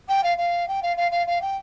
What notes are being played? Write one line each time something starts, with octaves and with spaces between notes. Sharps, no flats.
G5
F5
F5
G5
F5
F5
F5
F5
G5